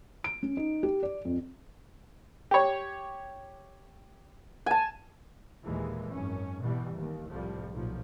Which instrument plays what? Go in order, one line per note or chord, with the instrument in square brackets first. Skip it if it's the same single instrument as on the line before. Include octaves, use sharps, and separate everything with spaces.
[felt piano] D7
C#4
D#4
G4
D5
F2
[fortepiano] G4 C#5
[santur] G#5 A5
[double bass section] D#2 A#2 E3 G#3
G#1 F#2 C#4
B2 E3 G3
D#2
C2 A2 F3 G3
B1 A#2 F3